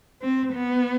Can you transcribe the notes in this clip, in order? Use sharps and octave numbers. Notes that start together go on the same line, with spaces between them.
C4
B3